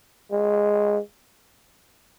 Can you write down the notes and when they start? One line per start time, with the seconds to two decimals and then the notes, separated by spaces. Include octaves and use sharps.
0.31 G#3